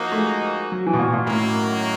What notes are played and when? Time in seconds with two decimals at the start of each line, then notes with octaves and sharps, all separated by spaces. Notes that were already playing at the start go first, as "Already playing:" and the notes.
Already playing: F3 A#3 D#4 F#4
0.12 A3
0.18 G#3
0.72 F#3
0.87 E3
0.93 B2
0.99 A#2
1.08 B2
1.13 A#2
1.26 F#2 A2 D#3 F#3 A#3